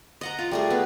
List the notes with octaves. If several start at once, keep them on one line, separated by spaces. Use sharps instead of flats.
D#5 F#5 A#5
F4
G3 A3 G#4
B3